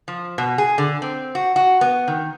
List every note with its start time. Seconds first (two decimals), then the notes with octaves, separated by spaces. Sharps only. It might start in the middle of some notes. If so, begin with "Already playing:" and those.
0.08 F3
0.38 B2
0.58 G#4
0.78 D3
1.02 C4
1.35 F#4
1.56 F#4
1.81 B3
2.08 D#3